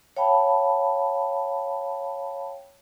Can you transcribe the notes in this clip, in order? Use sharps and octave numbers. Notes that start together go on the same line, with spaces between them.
C#5 F5 G5 A5 B5